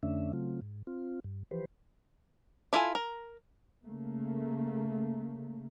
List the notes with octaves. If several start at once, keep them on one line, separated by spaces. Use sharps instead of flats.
F2 D3 A3 C#4 D4 E5
C#3 F#3 A3 C4 F4
G#2
C4 F4
G2
E3 F3 G4 B4 C5
D4 E4 F4 A4 G#5
A#4
C#3 A3 A#3